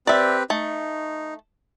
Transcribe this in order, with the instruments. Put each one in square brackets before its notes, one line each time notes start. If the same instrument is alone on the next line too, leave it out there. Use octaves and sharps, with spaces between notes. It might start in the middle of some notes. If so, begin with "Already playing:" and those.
[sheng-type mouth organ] C4 G4 B4 [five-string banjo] D5 E5
[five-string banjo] A3 [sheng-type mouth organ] D#4